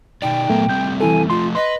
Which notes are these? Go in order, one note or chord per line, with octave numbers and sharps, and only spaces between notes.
B2 D#4 D5 G5
A#2 F#3 A3 B3 A#4
G3 A3 C4 G6
E3 E4 A4 G#5
F3 A3 F4 C6
B4 D#5 C6